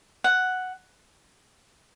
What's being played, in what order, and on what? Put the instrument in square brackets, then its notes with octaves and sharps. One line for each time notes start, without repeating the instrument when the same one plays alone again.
[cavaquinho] F#5